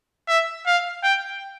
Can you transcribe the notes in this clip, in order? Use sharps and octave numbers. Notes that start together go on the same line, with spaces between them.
E5
F5
G5